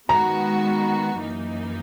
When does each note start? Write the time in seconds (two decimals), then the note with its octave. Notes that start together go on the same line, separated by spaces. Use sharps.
0.09 D#3 G#3 B3 F#4 A#5
1.20 F#2 E3 A#3 D#4